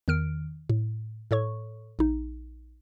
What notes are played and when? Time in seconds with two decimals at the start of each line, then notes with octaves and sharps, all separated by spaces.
0.08 E2 D#3 F6 D7
0.70 A2
1.31 A2 A4 C#5 C#6
1.99 A#1 D#4